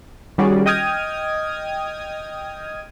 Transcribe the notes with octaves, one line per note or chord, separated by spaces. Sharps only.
D#3 G3 C#4 F#4 G#4 D5
D#5 G5 D#6 F6 G#6